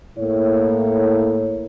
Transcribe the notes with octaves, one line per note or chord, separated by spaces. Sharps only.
A2 A#3 E4 A4 C#5